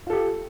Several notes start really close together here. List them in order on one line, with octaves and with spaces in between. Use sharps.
F4 A4 G4